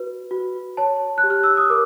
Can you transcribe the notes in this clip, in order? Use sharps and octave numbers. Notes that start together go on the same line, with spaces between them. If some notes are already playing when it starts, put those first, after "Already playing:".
Already playing: F#4 B4
F#4
C#5 A5
F#6
G4
F6
E6
D#6
A#4 D6